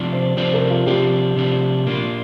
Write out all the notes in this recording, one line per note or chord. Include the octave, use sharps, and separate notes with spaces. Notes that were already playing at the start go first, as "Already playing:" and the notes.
Already playing: C3 F3 D4
C5
C3 F3 D4 C5
A#4
F4
C3 F3 D4 G4
C3 F3 D4
A#2 A#3 D4 F4